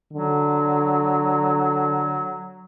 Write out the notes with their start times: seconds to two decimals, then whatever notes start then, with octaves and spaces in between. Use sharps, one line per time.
0.13 D3 F#3